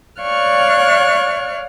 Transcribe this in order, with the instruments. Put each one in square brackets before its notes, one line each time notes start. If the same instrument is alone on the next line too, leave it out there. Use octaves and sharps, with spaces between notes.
[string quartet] C#5 D5 F5 C#6 F6 F#6